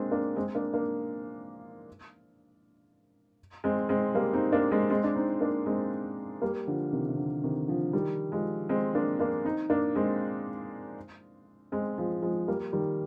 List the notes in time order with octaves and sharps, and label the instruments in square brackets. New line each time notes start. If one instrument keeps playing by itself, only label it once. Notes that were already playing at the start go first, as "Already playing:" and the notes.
Already playing: [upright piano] G#3 A#3 C4 D4
A#3 D4
G#3 C4
A#3 D4
A#3 D4
G#3 C4
G#3 C4
G3 A#3
C4 D#4
A#3 D4
G#3 C4
G#3 C4
D4
C4 D#4
A#3 D4
G#3 C4
G3 A#3
D3 F3
C3 D#3
C3
D3
C3 D#3
D3 F3
D#3 G3
F3 G#3
G#3 C4
A#3 D4
A#3 D4
C4 D#4
A#3 D4
G#3 C4
G#3 C4
F3 G#3
F3 G#3
G3 A#3
D#3 G3